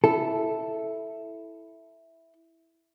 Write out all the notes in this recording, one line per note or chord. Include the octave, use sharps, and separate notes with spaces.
E4 A4